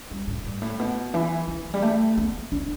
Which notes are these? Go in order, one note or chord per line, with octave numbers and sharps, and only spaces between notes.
G3
A2
G2
A2
B2
E3
E3
G3
A3
B3
D4